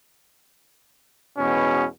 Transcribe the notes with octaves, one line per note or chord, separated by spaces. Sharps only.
E2 G#2 B2 C#4